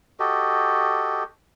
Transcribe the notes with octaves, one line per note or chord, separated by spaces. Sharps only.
F#4 G4 A4 D#5